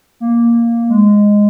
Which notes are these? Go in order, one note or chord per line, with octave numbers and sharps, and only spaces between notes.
A#3
G#3